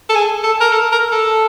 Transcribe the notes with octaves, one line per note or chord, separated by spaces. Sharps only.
A4
G#4
A4
A#4
A4
A#4
A4